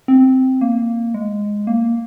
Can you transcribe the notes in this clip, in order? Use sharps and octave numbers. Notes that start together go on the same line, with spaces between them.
C4
A#3
G#3
A#3